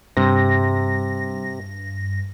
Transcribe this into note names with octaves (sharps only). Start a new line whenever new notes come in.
G2 C3 A#6